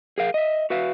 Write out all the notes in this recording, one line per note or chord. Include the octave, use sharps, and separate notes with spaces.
G#4 A#4 F5
D#5 E5
F#4 B4 E5 F5